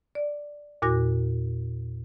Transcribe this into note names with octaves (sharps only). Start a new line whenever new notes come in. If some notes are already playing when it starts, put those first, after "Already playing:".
D5
E2 A#2 F#4 A#6